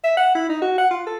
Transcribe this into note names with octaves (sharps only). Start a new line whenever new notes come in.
E5
F#5
E4
D#4
F#4
F#5
F4
A4